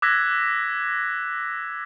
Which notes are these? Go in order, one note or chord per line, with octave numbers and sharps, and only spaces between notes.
D6 E6 F#6 G#6 A#6 B6